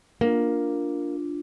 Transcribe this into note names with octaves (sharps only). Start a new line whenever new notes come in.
A#3 D4 F4